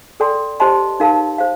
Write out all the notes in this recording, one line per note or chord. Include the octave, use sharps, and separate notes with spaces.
A4 D5 G5 C6
G4 C5 D#5 A5 C6
D#4 A#4 F5 A5
C5 F5